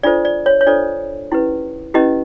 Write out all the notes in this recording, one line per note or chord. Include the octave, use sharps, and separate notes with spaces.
D4 F4 A4 C5 D5
D5
C#5
C#5
D4 F4 A4 C5 D5
C#4 E4 G4 B4
C#4 E4 G4 B4 D#5